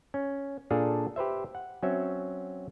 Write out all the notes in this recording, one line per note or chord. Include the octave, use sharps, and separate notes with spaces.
C#4
A#2 D4 G#4 A4 F5
G4 B4 C5 E5
F#5
F#3 C4 C#4 E5